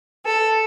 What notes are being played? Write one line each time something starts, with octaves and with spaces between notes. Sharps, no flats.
A4